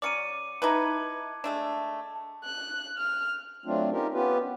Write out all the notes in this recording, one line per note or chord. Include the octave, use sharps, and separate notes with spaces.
F#3 C#4 D5 D6 C#7 D#7
D#4 E4 B4 A5 D6 G#6
G#3 A3 D4 A5
F#6
F6
F#3 A3 C4 D4 F4
C#4 D#4 F4 G4 A#4
B3 C#4 F4 G4 B4